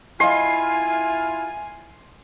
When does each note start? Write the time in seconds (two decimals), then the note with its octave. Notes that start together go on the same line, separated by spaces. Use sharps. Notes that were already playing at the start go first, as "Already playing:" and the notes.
0.20 E4 F4 D#5 F5 G#5 C6